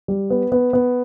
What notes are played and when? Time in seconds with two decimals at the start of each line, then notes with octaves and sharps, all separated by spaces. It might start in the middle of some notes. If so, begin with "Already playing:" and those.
0.08 G3
0.30 B3
0.52 B3
0.73 B3